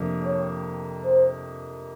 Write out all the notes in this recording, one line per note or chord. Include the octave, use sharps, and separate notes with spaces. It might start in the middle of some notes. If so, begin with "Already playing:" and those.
Already playing: F2 C3 F3 A#3 D4
C#5
C5